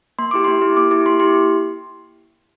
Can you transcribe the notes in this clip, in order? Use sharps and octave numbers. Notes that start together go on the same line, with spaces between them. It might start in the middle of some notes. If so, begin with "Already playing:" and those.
A#3 C6
E4 G4 D6
A#3 C6
E4 G4
A#3 D6
E4 G4 D6
A#3 C6
E4 G4 C6